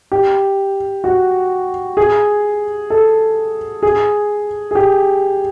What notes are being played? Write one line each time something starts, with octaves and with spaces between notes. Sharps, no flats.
G4
F#4
G#4
A4
G#4
G#4
G4